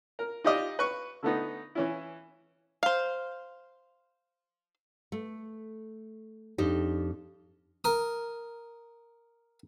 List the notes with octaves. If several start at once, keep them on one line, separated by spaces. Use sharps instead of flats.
A#4
D#4 F4 G4 D5 D#5
B4 C#6
D3 A3 B3 D#4
E3 C#4 E4
C5 F5
A3
F2 D4 D#4 G4
A#4 D#6